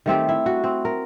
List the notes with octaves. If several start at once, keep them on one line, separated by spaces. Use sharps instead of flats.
D#3 A3 C4 G4
E4
F#4
C4
A#4